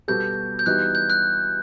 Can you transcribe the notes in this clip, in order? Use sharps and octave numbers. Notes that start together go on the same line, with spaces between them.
B2 G3 B3 F#4 A4 G6
G6
E3 G3 B3 D#4 F#4 F#6
G6
F#6